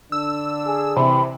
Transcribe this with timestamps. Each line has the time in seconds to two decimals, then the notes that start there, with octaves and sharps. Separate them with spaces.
0.12 D3 D4 E6
0.66 G#4
0.97 C3 E3 C4 B5